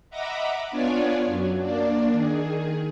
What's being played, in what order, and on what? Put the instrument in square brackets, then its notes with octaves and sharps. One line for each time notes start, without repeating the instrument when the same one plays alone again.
[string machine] D#5 E5 F#5 A#5 B5 D6
B3 D4 F4 C#5 D5 G#5
F#2 F#3
A#3 D4 D5
D#3 G#4